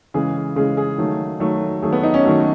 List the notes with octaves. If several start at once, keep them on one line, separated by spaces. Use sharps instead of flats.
C#3 E3 G#3 G#4
C#3 E3 G#3 G#4
G#4
D#3 F#3 A3
D#3 F#3 A3
D#3 F#3 A3 G#4
B3
D#4
C#4
D#3 F#3 A3 F#4